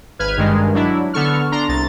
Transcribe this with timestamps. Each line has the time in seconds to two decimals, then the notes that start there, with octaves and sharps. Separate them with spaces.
0.19 G#1 B4 F6 G#6
0.37 G2 D#3 G#3
0.74 F#3 D4 E4
1.13 D3 B3 A4 C#6 F6
1.52 D4 A#5 C6
1.68 C2 A6